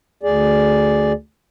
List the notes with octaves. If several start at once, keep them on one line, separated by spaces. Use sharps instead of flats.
D2 G#4 D5